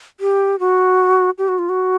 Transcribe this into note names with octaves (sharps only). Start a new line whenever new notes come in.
G4
F#4
G4
F#4
F4
F#4